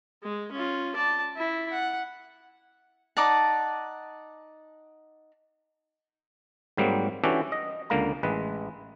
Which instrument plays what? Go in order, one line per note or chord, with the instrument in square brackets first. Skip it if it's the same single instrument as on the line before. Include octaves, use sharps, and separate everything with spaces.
[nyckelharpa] G#3
C#4 F4
D5 A5
E4
F#5
[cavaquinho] D#4 D5 F#5 A5
[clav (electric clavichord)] G#2 F#3 G3 A#3 C4
E3 C#4 D4 F#4 G4 A4
D#5
C#2 D3 A#3 F5 A#5
A1 G#3 B4